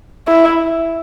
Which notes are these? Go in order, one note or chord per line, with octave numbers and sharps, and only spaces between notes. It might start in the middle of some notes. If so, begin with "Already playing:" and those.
E4